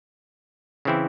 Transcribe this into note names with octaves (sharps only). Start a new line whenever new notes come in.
C#3 E3 C4 E4